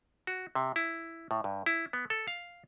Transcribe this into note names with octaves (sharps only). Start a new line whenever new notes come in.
F#4
C3
E4
A2
G2
E4
B3
A4
F5